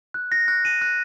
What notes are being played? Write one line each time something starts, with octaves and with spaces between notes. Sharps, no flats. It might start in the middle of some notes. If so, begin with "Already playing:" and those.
F#6
A#6
F#6
D#7
F#6